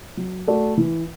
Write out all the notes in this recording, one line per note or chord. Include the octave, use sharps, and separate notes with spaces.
F#3
A3 F#4 D5
E3